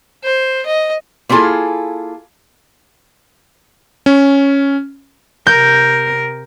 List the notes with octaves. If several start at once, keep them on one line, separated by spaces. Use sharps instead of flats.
C5
D#5
A#3 B3 E4 F4 G#4 A4
C#4
C3 A#4 G6